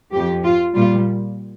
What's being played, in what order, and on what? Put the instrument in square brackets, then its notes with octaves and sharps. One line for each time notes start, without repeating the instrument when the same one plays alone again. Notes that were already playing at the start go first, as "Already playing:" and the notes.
[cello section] F2 F3 G4
F4
A#2 G3 F4